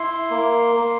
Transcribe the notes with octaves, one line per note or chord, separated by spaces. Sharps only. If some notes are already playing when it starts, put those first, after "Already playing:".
Already playing: E4 C6
A#3
A#3